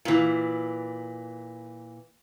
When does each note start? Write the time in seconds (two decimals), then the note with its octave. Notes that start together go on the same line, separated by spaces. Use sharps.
0.05 A#2 E3